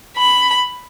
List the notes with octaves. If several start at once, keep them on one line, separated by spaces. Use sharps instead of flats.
B5